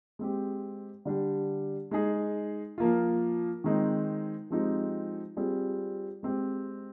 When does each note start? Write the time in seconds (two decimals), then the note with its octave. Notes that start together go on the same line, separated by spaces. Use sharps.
0.19 G#3 C4 G4
1.05 D3 G3 D4 G4
1.91 G#3 D#4 G#4
2.78 F3 A#3 F4
3.64 D#3 G#3 C4 D#4
4.50 F3 G#3 C4 D#4 G4
5.37 G3 C4 F4 G#4
6.23 G#3 C4 G4